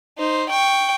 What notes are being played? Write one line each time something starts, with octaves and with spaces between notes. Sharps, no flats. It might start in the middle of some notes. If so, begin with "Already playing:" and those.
D#4 C5
G5 C#6